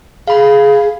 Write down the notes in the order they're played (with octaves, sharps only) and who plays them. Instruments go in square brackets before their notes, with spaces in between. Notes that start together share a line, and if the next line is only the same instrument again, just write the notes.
[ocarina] G#4 [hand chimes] F5 B5